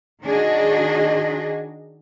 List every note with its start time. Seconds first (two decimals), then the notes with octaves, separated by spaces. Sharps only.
0.23 D#3 D4 F#4 G#4 D#5